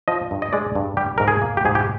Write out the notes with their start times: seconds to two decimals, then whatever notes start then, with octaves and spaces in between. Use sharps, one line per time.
0.08 F3 D#5
0.31 G2
0.42 D#5
0.53 G#3 D5
0.75 G2
0.97 G3 G4
1.18 G#2 A#4
1.28 G#4
1.42 A#3
1.57 G4
1.65 G#2 G#4
1.75 G4